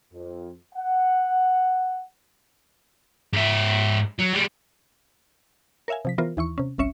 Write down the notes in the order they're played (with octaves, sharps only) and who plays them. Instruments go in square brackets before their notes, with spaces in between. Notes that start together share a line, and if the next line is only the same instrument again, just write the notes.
[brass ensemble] F2
F#5
[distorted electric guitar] G#2 E5
F#3
G3 G#3
[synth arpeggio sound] A#4 C#5 E5 F5 G#5
C3 F3 B6
E3 B3 F4 A#4 C5
D#2 E3 E4 C#6
C3 C#4
G1 C2 C#4 E5 C#7